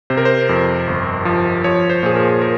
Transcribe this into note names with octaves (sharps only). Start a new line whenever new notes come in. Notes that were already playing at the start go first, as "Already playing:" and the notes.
C3 C5
A#4
C5
F2
G1
F3
F3 C#5
C5
A#2 G#4
A#4
A#4